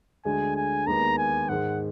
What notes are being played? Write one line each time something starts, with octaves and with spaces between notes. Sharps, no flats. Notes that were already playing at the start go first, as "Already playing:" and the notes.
D2 D3 G#3 D4 G#4 G#5
G#5
D#2 D#3 G#3 B3 A#5
G#5
G#2 D#3 G#3 F#5